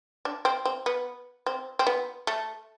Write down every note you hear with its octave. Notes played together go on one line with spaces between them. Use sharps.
D4
C4
C4
B3
C4
C4
B3
A3